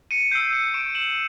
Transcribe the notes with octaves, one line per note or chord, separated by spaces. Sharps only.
C#7 D#7
C#7
E6 G6 C7 D7
C#7 D#7
C#6 D7 E7
E7 F#7